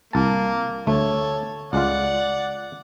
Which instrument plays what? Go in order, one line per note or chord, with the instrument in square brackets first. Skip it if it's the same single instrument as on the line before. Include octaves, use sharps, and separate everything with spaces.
[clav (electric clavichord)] C2 A5 [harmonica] A#3
[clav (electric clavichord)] D2 A3 [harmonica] A4 C#5
[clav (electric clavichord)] C#2 G#3 F4 [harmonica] D5 F#5